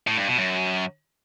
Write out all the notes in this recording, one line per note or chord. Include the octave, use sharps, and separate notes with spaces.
A2
G2
B2
F#2